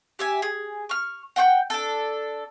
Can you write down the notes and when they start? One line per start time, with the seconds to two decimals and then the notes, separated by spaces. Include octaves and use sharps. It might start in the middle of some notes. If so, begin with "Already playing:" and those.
0.19 G4 E5 G#5
0.42 G#4
0.89 C#6 F6
1.36 F#5 G5 C#6 G6
1.70 D4 A4